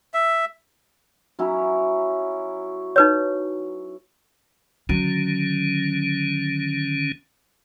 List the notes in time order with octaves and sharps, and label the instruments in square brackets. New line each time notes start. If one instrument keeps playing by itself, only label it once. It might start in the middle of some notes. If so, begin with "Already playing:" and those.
[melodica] E5
[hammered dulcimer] F#3 C#4 E4
[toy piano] D#4 B4 C#5
[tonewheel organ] D3 D#3 C#4 [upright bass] F#3